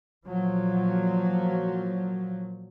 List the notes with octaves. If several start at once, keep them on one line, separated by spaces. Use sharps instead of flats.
A#2 F3 F#3